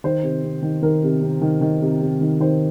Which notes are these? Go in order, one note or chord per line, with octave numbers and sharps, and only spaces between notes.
D#3 C5
C3
C3
D#3
D#3 A#4
C3
C3
D#3
D#3
C3
C3
D#3
D#3 C5